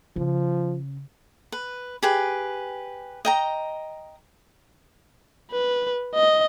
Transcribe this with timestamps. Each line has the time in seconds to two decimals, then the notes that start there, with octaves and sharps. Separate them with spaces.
0.16 C#3 F3
1.52 B4
2.03 G4 G#4 B4
3.25 D#5 G5 A#5
5.52 B4
6.15 D#5